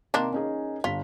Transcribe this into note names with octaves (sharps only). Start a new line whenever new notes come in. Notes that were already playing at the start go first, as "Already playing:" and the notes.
C3 D#3 A#3 D4 C6
C#4 D#4 G#4
G1 F4 B6